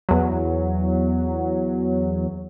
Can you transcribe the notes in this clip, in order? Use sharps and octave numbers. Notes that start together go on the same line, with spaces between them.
E2 F#3